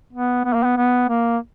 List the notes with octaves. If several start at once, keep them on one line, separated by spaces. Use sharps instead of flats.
B3
B3
A#3
B3
B3
A#3